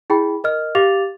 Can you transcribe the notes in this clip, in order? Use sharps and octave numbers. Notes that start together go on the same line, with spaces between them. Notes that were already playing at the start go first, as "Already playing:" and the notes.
E4 G#4 G5 B5
A#4 D#5 F6
G4 F5 D6 A6 F7